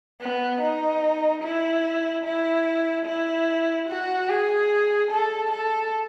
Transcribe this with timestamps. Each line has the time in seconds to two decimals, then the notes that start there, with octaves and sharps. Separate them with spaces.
0.21 B3
0.62 D#4
1.43 E4
2.24 E4
3.06 E4
3.89 F#4
4.29 G#4
5.11 A4
5.51 A4